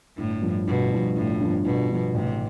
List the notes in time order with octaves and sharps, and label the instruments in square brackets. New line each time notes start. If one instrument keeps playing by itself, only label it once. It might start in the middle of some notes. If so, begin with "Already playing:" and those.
[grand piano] G1 [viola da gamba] A2
[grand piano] G2 F3
[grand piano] G1 [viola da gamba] B2
[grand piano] G2 F3
[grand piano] G1 [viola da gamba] A2
[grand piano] G2 F3
[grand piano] G1 [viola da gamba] B2
[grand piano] G2 F3
[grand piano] A1 [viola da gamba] C3